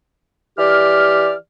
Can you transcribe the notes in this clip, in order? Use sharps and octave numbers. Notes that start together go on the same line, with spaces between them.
E3 G4 D5 F6